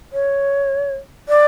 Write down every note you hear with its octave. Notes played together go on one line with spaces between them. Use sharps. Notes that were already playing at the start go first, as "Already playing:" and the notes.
C#5
D5